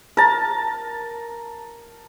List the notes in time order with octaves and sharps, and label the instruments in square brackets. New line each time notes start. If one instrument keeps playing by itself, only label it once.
[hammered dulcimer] A#4 A5